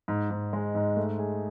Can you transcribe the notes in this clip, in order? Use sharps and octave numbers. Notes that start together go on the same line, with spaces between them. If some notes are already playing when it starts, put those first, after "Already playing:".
G#2
G#2
G#3
G#2
A3
G#4